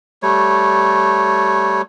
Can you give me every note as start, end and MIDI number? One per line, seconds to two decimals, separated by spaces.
0.23 1.82 55
0.23 1.82 57
0.23 1.82 73